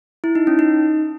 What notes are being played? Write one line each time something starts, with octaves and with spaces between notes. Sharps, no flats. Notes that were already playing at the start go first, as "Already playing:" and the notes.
E4
D#4
C#4
D#4